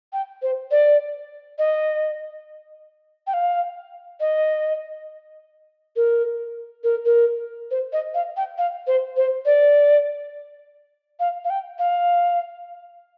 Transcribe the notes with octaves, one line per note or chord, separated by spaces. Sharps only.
G5
C5
D5
D#5
G5
F5
D#5
A#4
A#4
A#4
C5
D#5
F5
G5
F5
C5
C5
D5
F5
F5
G5
F5